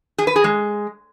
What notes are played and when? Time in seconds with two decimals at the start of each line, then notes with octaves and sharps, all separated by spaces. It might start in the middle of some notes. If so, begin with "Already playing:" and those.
0.18 G#4
0.27 B4
0.36 G#4
0.44 G#3